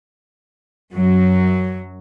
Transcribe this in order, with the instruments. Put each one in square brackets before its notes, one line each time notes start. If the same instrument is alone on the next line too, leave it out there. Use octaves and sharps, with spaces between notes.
[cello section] F#2 F#3